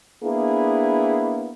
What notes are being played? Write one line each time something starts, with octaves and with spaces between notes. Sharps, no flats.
A#3 B3 D4 E4 G#4